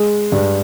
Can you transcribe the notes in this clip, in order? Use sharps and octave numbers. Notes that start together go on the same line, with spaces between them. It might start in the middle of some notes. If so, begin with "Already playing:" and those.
Already playing: G#3
G2